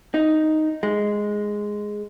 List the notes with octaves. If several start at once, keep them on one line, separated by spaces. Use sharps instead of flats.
D#4
G#3